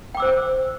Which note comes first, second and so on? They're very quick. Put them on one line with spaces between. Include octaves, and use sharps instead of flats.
G5 D6 E6 C5